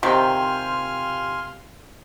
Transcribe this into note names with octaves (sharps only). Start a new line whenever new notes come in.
C3 D#3 C4 F4 G4 G#5 C6 F6